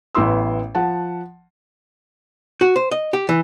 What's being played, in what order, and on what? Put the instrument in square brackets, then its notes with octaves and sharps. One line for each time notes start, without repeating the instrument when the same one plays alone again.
[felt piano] A1 B3 E4 C6 E6
F3 F#5 A5
[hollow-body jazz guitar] F#4
C5
D#5
G4
E3